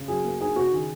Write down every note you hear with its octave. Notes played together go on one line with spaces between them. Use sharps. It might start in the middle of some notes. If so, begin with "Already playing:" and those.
Already playing: C#3
F#3 G#4
A#3
D#4 G#4
C#3 F#4
D#3 G#4